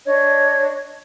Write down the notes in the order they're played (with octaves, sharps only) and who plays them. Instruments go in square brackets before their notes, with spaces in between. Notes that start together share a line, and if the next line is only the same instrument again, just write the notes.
[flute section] D4 C#5 D#5 G#6